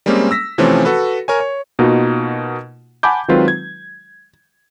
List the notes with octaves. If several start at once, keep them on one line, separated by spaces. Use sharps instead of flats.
G3 G#3 A#3 C4 C#4
E6 A#6 B6
C3 E3 F3 A3 C4 C#4
F#4 A4 B4
A#4 C#5 G#5
C#5
B2 A#3 D#4 F4 F#4
F#5 G#5 A5 B5 D6 G6
D#3 F#3 G#3 C4 F4 B4
G#6